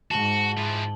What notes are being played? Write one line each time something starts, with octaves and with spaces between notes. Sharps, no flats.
G#2 F#4 A5 F#7 G7
E3 F3